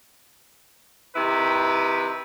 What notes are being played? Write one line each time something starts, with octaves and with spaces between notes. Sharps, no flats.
C3 D#3 E4 B4